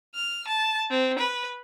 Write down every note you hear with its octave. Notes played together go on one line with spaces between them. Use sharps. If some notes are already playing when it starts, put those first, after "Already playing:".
F6
A5
C4
B4